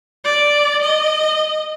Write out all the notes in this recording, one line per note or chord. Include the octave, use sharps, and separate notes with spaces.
D5
D#5